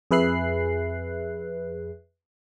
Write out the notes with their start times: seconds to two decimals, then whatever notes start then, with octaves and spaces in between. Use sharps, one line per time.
0.11 F2 G#4 B4 E5 F#6 C7